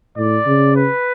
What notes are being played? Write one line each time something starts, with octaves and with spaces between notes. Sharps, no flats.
A2 D5
C#3
B4